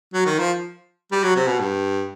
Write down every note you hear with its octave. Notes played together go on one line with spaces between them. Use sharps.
F#3
D#3
F3
G3
F#3
C3
B2
G2